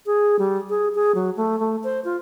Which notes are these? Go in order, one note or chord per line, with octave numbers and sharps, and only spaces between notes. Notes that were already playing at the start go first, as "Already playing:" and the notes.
G#4
G3
G#4
G#4
F#3
A3
A3
C5
F4